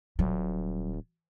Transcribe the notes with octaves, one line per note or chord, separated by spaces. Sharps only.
D#1 F#3